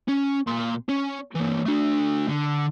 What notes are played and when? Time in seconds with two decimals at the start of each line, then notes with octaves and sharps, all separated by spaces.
0.08 C#4
0.47 A#2 C6
0.89 C#4
1.35 E3 A#3
1.66 A3 D4
2.28 D3